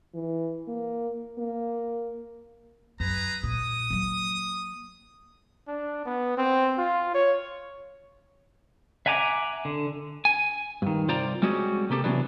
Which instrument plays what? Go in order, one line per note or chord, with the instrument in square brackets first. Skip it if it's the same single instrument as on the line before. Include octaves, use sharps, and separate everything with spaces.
[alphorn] E3
A#3
A#3
[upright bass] F#2 [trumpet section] G#4 B4 A#5
[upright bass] A#2 [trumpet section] D#6
[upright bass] F#3 A#3
[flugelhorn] D4
B3
C4
F4
C#5
[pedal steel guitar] E5 F#5 G#5 A#5 D6
D3
[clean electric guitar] G#5
G2 D#3
C2 F4 C5 D5 A#5
G3 G#3 C4 C#4 F#4 G#4
C3 A#3 G4 A4
C3 E3 F#3 B3 D4